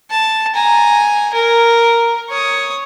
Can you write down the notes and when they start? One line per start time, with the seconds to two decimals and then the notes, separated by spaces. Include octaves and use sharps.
0.11 A5
0.55 G#5 A#5
1.34 A#4
2.30 C#5 D#6